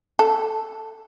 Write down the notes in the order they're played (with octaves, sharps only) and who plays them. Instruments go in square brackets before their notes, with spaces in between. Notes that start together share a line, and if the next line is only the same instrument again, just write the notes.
[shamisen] A4